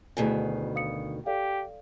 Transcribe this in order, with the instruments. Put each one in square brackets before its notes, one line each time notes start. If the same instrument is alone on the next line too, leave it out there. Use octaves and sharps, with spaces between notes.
[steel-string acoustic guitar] D2 B2 D#3 [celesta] E4 G#4 G#5
[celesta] F5 D#6 C#7
[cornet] G4 [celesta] A4 D5 F5